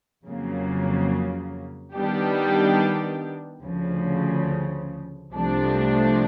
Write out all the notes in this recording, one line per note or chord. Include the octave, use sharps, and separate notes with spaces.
F2 C#3 F#3 A#3
D#3 G3 B3 D4 G4
D2 C#3 F3
C2 C3 F3 A3 D4